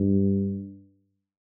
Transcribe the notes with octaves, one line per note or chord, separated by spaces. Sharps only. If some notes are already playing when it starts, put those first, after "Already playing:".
Already playing: G2